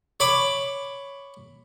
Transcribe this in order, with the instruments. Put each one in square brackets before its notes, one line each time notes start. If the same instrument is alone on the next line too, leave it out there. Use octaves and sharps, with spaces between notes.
[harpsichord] C#5 B5 D6